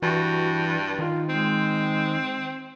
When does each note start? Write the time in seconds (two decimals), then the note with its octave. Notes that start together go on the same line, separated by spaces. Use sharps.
0.02 G2 E3 F#4
0.99 D#3 F4
1.29 G#3 C4